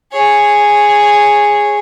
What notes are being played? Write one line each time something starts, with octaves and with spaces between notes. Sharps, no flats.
G#4 C#5